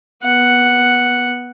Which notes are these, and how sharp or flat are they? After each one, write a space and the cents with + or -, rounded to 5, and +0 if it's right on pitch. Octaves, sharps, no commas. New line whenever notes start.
B3 -20 F#5 +0